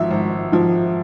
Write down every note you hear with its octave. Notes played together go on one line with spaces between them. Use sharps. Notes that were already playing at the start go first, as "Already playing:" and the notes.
Already playing: G#1 G#2 F3 E5
G#1
G#2 F3